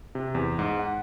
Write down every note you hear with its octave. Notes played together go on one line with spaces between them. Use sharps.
C3
E2
G#2
F#5